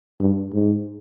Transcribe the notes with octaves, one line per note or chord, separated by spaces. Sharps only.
G2
G#2